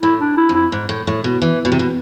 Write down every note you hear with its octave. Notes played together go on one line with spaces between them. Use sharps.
A2 E4
D4
E4
F2
E4
G#2
A2
A2
B2
E3
B2
C3
B2